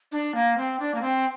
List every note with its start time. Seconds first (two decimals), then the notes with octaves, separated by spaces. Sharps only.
0.12 D4
0.34 A#3
0.57 C4
0.79 D4
0.94 A#3
1.01 C4